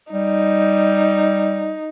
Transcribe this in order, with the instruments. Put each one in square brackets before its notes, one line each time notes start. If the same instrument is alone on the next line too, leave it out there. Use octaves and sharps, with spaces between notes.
[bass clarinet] G3 [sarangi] D#4